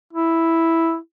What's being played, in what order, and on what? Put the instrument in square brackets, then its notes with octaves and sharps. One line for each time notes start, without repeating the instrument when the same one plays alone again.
[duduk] E4